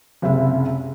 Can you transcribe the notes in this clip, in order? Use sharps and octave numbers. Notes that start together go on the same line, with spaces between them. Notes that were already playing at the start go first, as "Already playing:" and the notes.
F#1 C#2 C3 E5